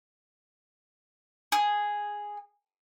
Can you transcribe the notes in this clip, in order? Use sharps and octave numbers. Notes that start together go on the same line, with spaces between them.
G#4